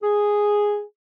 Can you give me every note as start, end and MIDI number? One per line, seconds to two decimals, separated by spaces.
0.02 0.82 68